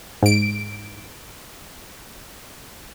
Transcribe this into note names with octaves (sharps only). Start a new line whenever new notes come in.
G#2 D7